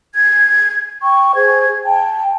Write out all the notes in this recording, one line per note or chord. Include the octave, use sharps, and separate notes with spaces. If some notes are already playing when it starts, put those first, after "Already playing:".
G#6
G5 C#6
G#4 C5 G#6
G5 A5